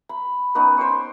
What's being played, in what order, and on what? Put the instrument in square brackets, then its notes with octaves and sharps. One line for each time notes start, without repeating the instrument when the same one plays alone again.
[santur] B5
B3 C#4 D#4 B4
C5 G5 C#6